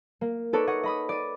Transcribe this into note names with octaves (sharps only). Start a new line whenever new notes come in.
A#3
D#4 A4 B4 C#5 D5
C#5 D#5 F#5
D#5 B5 D#6
D5 D#7